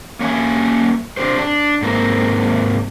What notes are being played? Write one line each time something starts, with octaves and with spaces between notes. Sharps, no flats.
A#3 C#4 E5 G#5
C4 D4 G4 C5
D4
G#2 A#3 C4